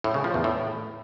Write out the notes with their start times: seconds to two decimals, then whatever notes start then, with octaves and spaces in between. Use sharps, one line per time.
0.04 A2
0.14 C#3
0.24 F3
0.34 E2
0.44 A2